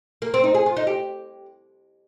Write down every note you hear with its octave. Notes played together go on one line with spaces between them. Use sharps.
A#3
C4
D#4
G#4
F4
D#4
G4